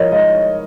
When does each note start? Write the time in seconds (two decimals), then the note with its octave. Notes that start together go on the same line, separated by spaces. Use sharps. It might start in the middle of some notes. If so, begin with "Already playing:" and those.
Already playing: F3 A#4 C#5 D#5
0.11 G#3 D#4 D#5